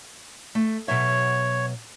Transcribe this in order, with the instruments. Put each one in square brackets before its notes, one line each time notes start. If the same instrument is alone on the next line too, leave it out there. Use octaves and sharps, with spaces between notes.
[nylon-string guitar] A3
[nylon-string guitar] B2 F#3 E5 [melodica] C#5